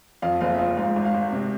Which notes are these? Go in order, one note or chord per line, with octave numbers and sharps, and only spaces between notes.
F2 F5
F#1 F5
E5
F3 F5
G#2 F5
G#1
F5
G#1
C3